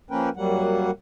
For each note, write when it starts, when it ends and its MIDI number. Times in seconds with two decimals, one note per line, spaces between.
0.11 0.29 53
0.11 0.29 58
0.11 0.29 61
0.11 0.29 70
0.11 0.29 71
0.11 0.29 79
0.37 0.91 42
0.37 0.91 54
0.37 0.91 55
0.37 0.91 58
0.37 0.91 78